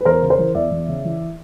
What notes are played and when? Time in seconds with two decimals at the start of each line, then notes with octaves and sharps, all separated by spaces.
0.01 B4
0.05 E2 A#4 C5
0.22 C#3
0.30 A#4 C5
0.38 E3
0.55 E2 D5 E5
0.71 E2
0.88 C#3
1.04 E3